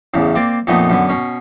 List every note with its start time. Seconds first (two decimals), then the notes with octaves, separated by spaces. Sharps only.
0.14 A1 E2 C#3
0.35 A#3 C4 D5
0.67 F2 A#2 A3 B3 D#4
0.90 F#2 D3 B3
1.09 B2 C#4